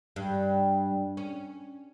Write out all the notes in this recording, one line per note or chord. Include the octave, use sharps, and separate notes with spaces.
G2
C#4